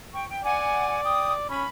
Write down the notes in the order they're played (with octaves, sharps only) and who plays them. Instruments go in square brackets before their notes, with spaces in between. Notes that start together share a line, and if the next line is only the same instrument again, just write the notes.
[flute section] G5 C#6
G5
[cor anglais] D5 [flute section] F#5 G#5
[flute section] G5 D#6
[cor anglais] C#4 [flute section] B5